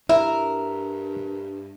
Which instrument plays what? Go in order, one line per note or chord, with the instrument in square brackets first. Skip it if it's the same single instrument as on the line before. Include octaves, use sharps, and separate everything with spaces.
[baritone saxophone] G2 [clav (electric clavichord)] E4 [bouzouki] A#4 [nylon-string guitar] E5